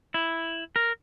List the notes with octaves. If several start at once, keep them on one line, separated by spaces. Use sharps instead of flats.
E4
A#4